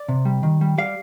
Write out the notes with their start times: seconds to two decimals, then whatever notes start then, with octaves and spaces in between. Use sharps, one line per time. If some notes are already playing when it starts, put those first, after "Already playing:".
Already playing: D5
0.09 C3
0.25 G3
0.43 D#3
0.61 G3
0.78 G3 F5